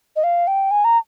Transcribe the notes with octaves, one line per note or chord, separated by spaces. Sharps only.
D#5
F5
G5
G#5
A#5